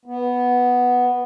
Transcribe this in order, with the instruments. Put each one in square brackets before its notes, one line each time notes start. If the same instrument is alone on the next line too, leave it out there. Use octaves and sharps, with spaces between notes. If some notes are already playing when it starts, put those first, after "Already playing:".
[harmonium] B3